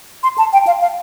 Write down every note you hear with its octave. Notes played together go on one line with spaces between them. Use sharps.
C6
A5
G5
F5
F5